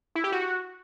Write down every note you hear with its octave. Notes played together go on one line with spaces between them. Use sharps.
E4
G4
F#4